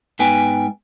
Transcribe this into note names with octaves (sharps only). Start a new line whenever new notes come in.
G#2 B3 B4 G5 G#5